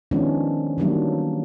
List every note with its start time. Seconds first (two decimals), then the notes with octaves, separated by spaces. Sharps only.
0.11 D#3 F3 G#3 B3 C#4 D4
0.78 D#3 E3 F#3 G3 A#3 D4